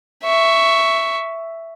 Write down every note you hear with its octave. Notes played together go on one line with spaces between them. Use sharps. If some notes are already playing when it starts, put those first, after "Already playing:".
E5 C#6